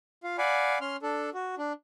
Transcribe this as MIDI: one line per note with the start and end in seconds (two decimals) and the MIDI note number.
0.24 0.37 65
0.24 0.37 77
0.38 0.78 74
0.38 0.78 77
0.38 0.78 78
0.38 0.78 80
0.38 0.78 83
0.81 0.97 61
0.81 0.97 84
0.81 0.97 89
1.02 1.30 62
1.02 1.30 69
1.34 1.55 66
1.58 1.73 62